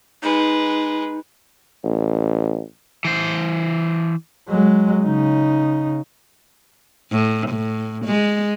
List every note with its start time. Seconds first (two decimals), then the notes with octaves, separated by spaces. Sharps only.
0.23 G#3 D#4 B4
1.84 A1
3.05 E3 C5
4.49 F#3 G#3
5.04 C#3 D#4
7.11 A2
7.50 A2
8.06 G#3